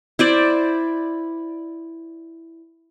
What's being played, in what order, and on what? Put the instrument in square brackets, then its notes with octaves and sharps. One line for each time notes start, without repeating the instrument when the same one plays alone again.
[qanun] E4 C5 D5